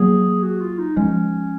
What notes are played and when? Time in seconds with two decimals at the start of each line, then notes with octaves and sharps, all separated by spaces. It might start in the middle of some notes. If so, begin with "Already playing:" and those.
Already playing: F#3 A#3 G#4
0.43 F#4
0.61 F4
0.78 D#4
0.96 F3 G#3 C#4